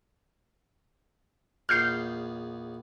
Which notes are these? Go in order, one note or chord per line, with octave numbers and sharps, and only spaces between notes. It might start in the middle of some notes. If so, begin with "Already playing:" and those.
A#1 E2 F6 G6 C7